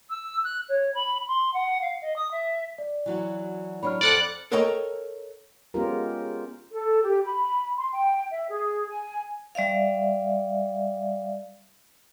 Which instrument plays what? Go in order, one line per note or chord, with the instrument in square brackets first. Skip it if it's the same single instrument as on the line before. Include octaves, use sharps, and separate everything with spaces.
[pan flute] E6
F#6
C#5
B5
C6
F#5
F5
D#5
D#6
E5
[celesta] D5
[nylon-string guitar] E3 F#3 F#4
[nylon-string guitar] F#3 D4 C#5 [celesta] B5 F6
[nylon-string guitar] F2 A4 C5 [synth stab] D5 F#5 F#6
[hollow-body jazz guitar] A4 A#4 C#5 D#5 G5 A#5
[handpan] G#3 B3 C#4 F4 G4 A#4
[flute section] A4
G4
B5
C6
G5
E5
G#4
G#5
[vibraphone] G3 D5 E5 F5